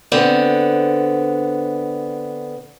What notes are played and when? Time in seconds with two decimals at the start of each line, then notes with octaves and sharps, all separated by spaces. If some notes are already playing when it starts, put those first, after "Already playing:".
0.12 D3 B3 C4